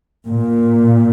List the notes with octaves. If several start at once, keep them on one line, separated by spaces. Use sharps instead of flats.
A#2